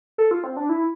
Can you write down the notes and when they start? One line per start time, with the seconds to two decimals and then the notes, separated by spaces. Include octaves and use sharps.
0.18 A4
0.31 F4
0.44 C4
0.57 D4
0.69 E4